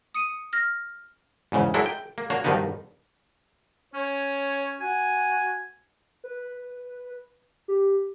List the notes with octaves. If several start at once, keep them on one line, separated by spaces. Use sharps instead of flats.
D#6 C#7 D#7
F6 A#6
E2 G#2 C#3 E3
F#3 G#3 D4 E4 A4 A#4
G5
A#3
A#3 D4 F#4 C#5
G2 B2 D#3 F3 B3 D#4
C#4 C#5
F#4 G#5
B4
G4